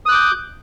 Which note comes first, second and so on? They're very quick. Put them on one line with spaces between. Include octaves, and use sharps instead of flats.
D#6 F#6 D6 G6